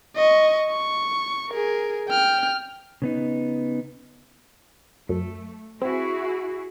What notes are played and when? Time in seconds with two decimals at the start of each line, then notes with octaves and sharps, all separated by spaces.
0.16 D#5 C#6
0.71 C#6
1.49 G#4 A#4
2.09 G5 F6
3.02 C#3 B3 D#4
5.09 F#2 A3
5.82 C4 E4 F#4 G#4